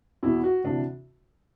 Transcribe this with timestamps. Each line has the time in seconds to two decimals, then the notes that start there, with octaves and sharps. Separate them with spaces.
0.23 E2 B2 E4
0.44 F#4
0.64 D2 C3 E3 D4